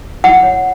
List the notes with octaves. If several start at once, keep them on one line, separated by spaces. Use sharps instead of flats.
E4 F#5
C#5